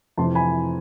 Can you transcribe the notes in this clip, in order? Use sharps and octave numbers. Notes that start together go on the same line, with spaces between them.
F2 C3 E3 A5 C6
G#5 B5